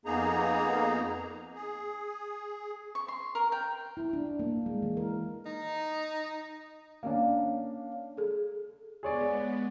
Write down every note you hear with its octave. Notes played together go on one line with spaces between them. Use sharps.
F2 A#3 B3 D#4 G#4 A#5
G#4
C#6
C6
A#4
G5
E4
D4
A#3
G#3
E3
A#4
D#4
A#3 C#4 D4
G#4 A4
G#3 B3 G#4 C#5 D5